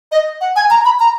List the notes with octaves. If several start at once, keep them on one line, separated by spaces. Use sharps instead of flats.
D#5
F#5
G#5
A#5
B5
A#5